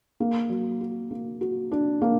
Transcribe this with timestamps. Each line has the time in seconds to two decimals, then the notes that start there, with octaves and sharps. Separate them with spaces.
0.20 A#3
0.49 F#3
0.81 F#4
1.11 A#3
1.41 F#4
1.71 D4
2.02 A#3